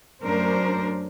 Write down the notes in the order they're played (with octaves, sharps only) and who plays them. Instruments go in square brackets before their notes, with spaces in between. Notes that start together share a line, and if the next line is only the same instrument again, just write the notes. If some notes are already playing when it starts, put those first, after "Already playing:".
[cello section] F#2 A3 D4 A#4 C5